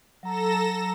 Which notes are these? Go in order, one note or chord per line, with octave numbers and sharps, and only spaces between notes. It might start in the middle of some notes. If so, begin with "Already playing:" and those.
F#3 A4 A#5 A#6 E7